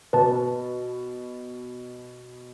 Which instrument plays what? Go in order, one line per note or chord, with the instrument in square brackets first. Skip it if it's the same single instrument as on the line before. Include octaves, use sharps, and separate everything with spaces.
[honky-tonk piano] B2 [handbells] B4 A5